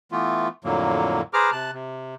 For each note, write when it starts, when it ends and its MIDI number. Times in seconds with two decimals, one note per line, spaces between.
0.12 0.48 52
0.12 0.48 57
0.12 0.48 59
0.12 0.48 65
0.64 1.21 41
0.64 1.21 45
0.64 1.21 50
0.64 1.21 54
0.64 1.21 58
1.34 1.50 68
1.34 1.50 71
1.34 1.50 72
1.34 1.50 82
1.34 1.50 86
1.34 1.50 89
1.52 1.71 48
1.52 1.71 81
1.52 1.71 90
1.74 2.15 48